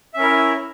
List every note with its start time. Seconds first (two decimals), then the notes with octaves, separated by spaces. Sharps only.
0.14 E5
0.17 C#4
0.20 A#4
0.22 E4